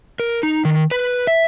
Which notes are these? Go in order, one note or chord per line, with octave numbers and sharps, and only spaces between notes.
A#4
D#4
D#3
B4
E5